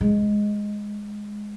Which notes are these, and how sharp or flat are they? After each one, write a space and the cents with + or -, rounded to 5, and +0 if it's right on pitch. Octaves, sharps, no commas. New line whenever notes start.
G#3 +0